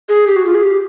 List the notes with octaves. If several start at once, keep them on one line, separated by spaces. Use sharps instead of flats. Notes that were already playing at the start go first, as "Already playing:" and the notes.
G#4
G4
F#4
F4
G#4
G4